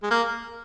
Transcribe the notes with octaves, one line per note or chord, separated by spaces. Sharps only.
G#3
A#3